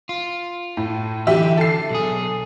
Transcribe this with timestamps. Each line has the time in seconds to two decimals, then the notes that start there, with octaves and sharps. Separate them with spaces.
0.09 F4
0.77 A2
1.27 D3 E3 F#3 G4 E5
1.57 A4 C7
1.90 B1 G#4